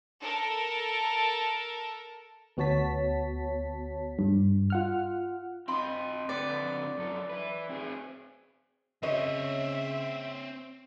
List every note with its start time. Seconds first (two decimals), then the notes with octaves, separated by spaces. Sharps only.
0.21 A4 A#4
2.57 D2 B3 F#4 C#5 A5 B6
4.19 G2
4.70 F4 F#5 F6
5.68 C4 F4 D#5 B5 C6
6.29 D3 C4 B4 D5
6.97 F#2 A4
7.30 E4 B4
7.69 C4 G#4
9.03 C#3 C4 F#4 C5 C#5 D#5 E5